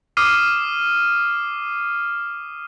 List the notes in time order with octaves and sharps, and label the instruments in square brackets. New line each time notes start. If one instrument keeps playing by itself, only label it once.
[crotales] D6 D#6 F6 C7 D#7